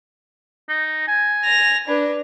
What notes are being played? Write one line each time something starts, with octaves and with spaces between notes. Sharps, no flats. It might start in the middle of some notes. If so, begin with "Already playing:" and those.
D#4
G#5
A#6 F7
D4 B4